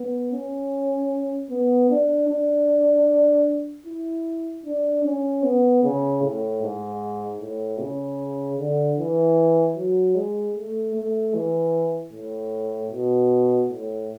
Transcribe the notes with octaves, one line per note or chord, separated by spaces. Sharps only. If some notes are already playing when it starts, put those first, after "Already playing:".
Already playing: B3
C#4
B3
D4
D4
E4
D4
C#4
B3
C#3
A2
G#2
A2
C#3
D3
E3
F#3
G#3
A3
A3
E3
A2
B2
A2